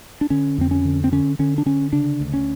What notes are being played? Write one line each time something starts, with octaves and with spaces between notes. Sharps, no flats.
D4
D3 C#4
F2 C4
C#4
D3
C4
D3 C#4
D3 C#4
D4
D3 C#4
C#3 D4
D2
C#4